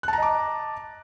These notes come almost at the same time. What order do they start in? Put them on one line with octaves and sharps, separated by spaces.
F#6 A5 A#5 D#5 D6